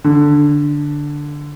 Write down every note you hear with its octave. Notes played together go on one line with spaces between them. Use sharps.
D3